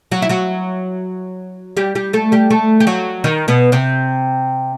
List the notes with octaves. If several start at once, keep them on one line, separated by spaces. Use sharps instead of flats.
F#3 F#4
E4
F#3 F#4
G3 G4
G3 G4
A3 A4
G3 G4
A3 A4
G4
F#3 F#4
D#3 D#4
B2 B3
C3 C4